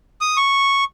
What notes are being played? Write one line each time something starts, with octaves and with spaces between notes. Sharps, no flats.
D#6
C#6